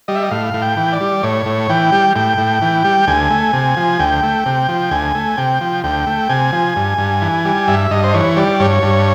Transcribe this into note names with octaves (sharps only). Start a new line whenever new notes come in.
G3 D#5
E5
D#5
A2 F5
A2
G5
E3
D5
G3
A2 C#5
A2
E3 G5
G3
A2 G5
A2
E3
G3
D2 G#5
A3
C3
F3
D2 G5
A3
C3
F3
D2 G#5
A3
C3 G5
F3
D2 G5
A3
C3 G#5
F3
G2
G2
E3
G3
G2 E5
G2 D#5
C5
E3 C#5
G3 D5
G2 C#5
G2